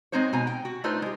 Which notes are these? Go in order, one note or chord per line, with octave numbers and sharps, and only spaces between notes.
G#3 C4 D#4 C5 C#5
B2 G#5 A#5
G5
F#4
A3 D4 D#4 F4 B4 C5
G#3 G4